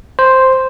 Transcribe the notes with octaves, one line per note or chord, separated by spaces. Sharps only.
C5